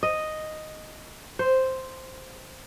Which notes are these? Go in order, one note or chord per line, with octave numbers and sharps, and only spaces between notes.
D#5
C5